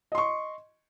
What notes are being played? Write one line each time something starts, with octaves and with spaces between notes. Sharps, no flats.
D#5 C6 C#6